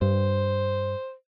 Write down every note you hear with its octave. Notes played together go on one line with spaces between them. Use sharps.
G2 C5